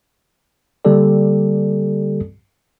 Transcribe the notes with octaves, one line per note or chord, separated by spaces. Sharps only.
D3 G3 A#3 G4 A4 D5